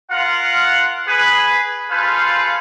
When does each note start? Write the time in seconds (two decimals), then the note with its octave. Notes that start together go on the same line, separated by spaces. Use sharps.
0.11 F4 A#4 F5 F#5
1.07 G#4 B4
1.90 F4 G#4 A4 B4 C5 F5